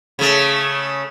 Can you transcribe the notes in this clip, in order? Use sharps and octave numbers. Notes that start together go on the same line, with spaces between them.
C#3 A3